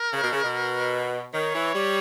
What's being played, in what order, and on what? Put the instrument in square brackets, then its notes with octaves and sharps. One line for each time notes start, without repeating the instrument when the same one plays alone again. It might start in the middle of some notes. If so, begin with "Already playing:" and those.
Already playing: [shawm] A#4
[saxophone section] C#3
B2
C#3
B2
[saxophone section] D#3 [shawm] C#5
[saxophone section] E3
G3